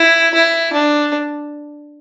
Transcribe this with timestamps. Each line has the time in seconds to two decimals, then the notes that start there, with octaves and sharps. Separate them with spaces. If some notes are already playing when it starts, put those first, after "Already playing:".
Already playing: E4
0.34 E4
0.73 D4